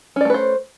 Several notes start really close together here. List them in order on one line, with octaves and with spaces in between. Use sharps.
C#4 D5 A3 B4 C5